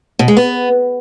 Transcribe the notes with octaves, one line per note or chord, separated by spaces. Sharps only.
B2
G#3
B3